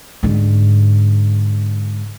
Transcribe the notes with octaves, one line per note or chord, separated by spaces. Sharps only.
G#2 D3